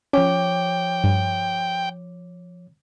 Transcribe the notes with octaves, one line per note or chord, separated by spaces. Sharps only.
F3 C#4 C#5 G5 D6
G2